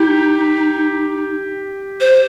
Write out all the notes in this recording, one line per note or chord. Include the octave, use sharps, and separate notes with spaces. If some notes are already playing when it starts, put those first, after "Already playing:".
Already playing: D#4 G4
C5